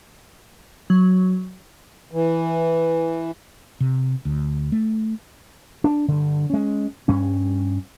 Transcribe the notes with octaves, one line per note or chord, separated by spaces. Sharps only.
F#3
E3
C3
D2
A3
D4
G2 D3
G#3 C#4
G2 G3 C#4